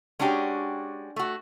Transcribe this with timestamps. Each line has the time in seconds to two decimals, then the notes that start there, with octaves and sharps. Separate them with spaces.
0.19 G#3 C#4 D4 F#4 G4
1.16 A3 F#4